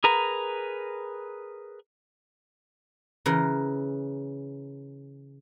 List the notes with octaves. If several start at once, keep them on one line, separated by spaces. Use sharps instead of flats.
G#4 A#4 B4 A#5
C#3 E3 A#4